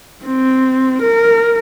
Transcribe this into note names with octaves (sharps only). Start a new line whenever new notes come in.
C4
A#4